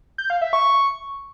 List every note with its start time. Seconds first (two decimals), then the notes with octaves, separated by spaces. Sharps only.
0.18 G6
0.30 F5
0.41 E5
0.53 C#6